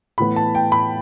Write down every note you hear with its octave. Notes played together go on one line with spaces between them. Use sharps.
A2 E3 B3 B5
A5
G5
B5